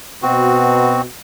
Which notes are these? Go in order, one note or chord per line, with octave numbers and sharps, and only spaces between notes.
B2 C4 F#4